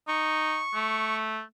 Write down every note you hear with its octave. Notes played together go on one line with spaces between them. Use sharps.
D#4 C#6
A3